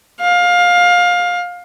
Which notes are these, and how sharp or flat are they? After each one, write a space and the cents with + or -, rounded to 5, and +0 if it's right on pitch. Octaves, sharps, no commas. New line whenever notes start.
F5 +20